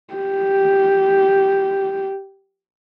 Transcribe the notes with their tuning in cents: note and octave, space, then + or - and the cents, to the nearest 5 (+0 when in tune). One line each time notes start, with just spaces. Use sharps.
G4 -5